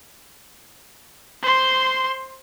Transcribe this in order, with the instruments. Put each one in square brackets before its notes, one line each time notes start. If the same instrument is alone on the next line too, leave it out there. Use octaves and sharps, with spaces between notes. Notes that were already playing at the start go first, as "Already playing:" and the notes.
[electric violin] C5 C6